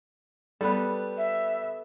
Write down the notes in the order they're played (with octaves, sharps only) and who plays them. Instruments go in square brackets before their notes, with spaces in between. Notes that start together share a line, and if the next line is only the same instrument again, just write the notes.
[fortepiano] G3 B3 [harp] A4 B4
[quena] E5